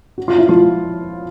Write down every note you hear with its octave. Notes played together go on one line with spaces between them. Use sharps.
F#4
F4
E4
F3 F4